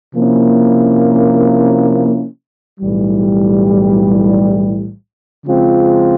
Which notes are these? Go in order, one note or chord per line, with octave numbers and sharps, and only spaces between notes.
C3 F3 A#3 C#4 E4
B1 A2 E3 G3
C#3 F3 G#3 C4 F4